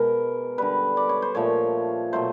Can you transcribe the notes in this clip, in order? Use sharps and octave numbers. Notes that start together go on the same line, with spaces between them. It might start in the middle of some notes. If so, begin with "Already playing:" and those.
Already playing: B2 G#3 A#4
D3 G3 B4
D5
C#5
C5
A#2 F3 A3 C#5
B2 F#3 A3 C5